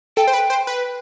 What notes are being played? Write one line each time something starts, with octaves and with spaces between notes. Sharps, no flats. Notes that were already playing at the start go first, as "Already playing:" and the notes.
A4 G5
C5
B4
C5
B4